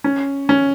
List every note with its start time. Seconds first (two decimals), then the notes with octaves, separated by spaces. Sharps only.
0.04 C#4
0.49 C#4